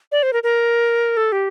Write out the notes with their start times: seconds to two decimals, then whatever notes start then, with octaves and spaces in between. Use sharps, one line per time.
0.12 D5
0.23 C5
0.33 A#4
0.43 A#4
1.17 A4
1.32 G4